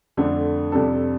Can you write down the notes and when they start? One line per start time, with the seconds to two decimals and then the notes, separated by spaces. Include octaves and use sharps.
0.17 F2 D3 A3 D4
0.72 F2 C3 G3 D4 A4